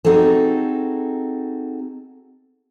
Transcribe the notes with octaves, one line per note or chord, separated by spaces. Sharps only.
C4 D#4 F#4 G#4 A4